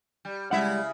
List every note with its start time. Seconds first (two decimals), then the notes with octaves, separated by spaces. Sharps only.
0.25 G3
0.51 C#3 G3 G#3 E4 E5 F#5